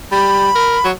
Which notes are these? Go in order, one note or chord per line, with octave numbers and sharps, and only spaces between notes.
G3 B5
A#4
F#3